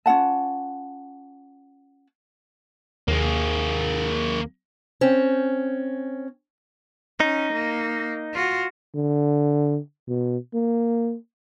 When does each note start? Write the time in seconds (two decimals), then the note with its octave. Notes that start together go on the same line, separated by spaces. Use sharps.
0.06 C#4 F4 F#5 A5
3.08 D#2 A#3 G#4
5.01 C4 C#4
7.20 C#4 D#4
7.53 A#3
8.34 F4 F#4
8.95 D3
10.08 B2
10.54 A#3